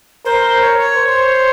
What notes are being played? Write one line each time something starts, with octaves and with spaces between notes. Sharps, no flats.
A#4 C5
C#5
C#5
C5